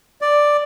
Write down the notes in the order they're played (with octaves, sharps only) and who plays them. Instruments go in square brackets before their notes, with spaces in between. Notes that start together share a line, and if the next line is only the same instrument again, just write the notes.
[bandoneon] D5